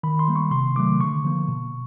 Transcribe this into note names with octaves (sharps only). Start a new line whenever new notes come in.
D#3 B5
C6
G3 A#3
C#6
C3 C6
D#3 F#3 A3 D6
D3 C#6
F3 A#3
B2